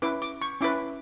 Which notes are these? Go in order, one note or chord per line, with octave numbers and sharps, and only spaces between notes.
C#4 E4 B4 D6
D6
C#6
C#4 E4 B4 D6